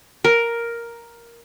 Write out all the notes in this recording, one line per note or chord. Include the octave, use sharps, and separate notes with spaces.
A#4